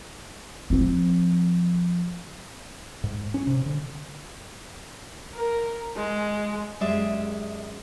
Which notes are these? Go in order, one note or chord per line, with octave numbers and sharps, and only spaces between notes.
F3 C4
G#2
C#4
C3
D3
A#4
G#3
F#2 G#3 G4 G#4 D5 E5